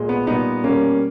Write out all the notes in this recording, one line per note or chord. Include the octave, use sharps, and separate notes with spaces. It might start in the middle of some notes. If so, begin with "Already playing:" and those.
Already playing: A#2 G#3
B3
A#2 G3 B3 D#4
B2 G3 A#3 C#4